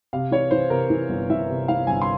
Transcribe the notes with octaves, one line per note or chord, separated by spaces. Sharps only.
C3 F5
E3 C#5
E3 C5
C3 A#4
E3
G1
E3 E5
C3
E3 F5
G1 G#5
C6